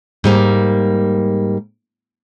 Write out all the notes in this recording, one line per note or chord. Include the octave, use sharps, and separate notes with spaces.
G#2 G3 A#3